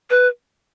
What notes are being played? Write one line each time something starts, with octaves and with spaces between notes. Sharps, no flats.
B4